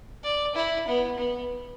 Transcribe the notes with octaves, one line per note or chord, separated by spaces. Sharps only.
D5
E4
B3
B3